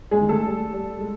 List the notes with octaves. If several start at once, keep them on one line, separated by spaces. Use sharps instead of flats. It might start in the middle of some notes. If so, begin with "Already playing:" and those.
G#3 G#4
D#3
A3 A4
G3
G3
G#3